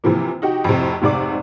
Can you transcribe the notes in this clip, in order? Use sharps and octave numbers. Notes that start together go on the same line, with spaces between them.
C3 E3 F3 A#3
D#4 F#4 G4
F2 A2 C3
F1 G#2 C3 D5 D6